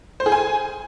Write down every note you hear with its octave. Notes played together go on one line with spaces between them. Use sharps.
C5
G#4
G#5